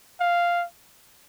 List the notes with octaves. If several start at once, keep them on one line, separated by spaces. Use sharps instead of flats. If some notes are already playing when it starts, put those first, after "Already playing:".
F5